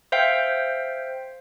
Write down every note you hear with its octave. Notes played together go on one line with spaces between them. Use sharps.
C5 E5 F5 G5